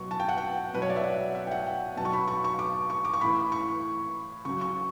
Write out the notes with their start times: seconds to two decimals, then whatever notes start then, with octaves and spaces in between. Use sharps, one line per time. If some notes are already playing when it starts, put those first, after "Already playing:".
Already playing: B2 F#3 C#6
0.11 A5
0.20 G5
0.28 F#5
0.38 G5
0.74 B2 F#3 B4
0.82 C#5
0.90 D5
0.96 E5
1.04 F#5
1.35 E5
1.47 G5
1.51 F#5
1.66 G5
1.97 B2 F#3 A5
2.05 C#6
2.13 B5
2.28 C#6
2.44 C#6
2.59 D6
2.90 C#6
3.05 D6
3.14 C#6
3.21 A2 E3 B5
3.52 C#6
4.45 C#3 F#3 C#6
4.61 C#6